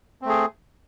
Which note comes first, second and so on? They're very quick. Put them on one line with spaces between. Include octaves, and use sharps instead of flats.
C4 A3 G#4